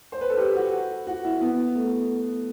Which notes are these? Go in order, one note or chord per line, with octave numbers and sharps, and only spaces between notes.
C5
B4
A4
G4
F#4
F#4
E4
B3
A3